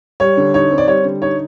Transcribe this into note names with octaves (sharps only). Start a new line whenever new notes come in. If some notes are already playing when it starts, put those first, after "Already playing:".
G3 C#5
D3
D#4 C#5
C4
D5
G3 C#5
D3
D#4 C#5